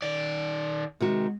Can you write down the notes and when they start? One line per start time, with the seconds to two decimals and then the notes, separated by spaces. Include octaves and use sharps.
0.02 D#3 D5
1.00 C3 D#3 G#3 F#4